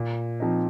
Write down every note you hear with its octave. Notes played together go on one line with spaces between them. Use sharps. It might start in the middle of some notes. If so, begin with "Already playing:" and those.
Already playing: A#2
F3 C4 D#4